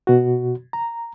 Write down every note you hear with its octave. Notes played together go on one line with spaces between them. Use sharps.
B2 F#4
A#5